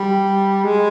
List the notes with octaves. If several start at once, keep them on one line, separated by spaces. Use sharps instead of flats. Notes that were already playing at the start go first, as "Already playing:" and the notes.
Already playing: G3
G#3